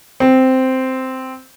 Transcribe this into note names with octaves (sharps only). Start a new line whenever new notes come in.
C4